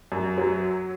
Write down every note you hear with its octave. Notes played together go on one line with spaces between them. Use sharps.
F#2
F#3